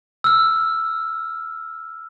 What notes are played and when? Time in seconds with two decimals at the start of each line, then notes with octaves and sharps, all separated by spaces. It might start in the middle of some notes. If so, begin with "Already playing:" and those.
0.24 E6 F6